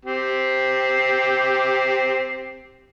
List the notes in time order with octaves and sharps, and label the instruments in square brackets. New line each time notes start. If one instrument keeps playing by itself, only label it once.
[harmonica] C4 G4